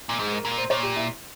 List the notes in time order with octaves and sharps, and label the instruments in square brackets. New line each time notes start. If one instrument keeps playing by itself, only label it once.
[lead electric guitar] A#2
[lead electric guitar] G#2 [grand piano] G#4
[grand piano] A#4
[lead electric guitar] A#2 [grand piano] A#4
[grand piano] C5
[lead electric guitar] A#2 [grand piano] C#5
[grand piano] G4
E4